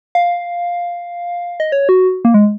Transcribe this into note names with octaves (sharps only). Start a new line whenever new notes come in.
F5
D#5
C#5
F#4
A#3
G#3